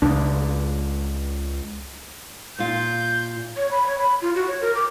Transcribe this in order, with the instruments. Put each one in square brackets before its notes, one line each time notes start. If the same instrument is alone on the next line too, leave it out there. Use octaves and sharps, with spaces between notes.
[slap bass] C#2 D4
[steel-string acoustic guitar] A#2 F4 [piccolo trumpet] G6
[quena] C#5
B5
C#5
B5
F4
F#4
C#5
A#4
D6